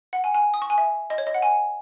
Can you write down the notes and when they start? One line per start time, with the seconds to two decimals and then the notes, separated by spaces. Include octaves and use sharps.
0.13 F#5
0.24 G#5
0.34 G#5
0.54 D#6
0.62 C#6
0.70 G#5
0.78 E5
1.10 D#5
1.18 C#5
1.27 D#5
1.34 F#5
1.42 G#5